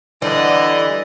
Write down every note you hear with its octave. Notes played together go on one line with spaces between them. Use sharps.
D3 E3 G3 D#5